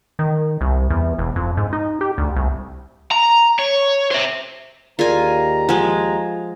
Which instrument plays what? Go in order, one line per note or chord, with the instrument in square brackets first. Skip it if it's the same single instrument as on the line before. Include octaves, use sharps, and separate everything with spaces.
[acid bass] D#3
C2
E2
E1
F2
G#2
D#4
G4
D2
C2
[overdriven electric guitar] A#5
C#5
C5 E5
[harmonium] D#2 A#5 [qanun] F4 G#5 [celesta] G#4 A#4 D5
[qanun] F3 G#3 [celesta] F#5 G#5 G#6